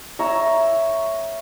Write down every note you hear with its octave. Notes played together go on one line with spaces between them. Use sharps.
C#5 E5 A#5